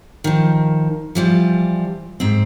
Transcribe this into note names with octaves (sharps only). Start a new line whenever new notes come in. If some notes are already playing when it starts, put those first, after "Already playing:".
D#3 F3
E3 F3 G3
G#2 C4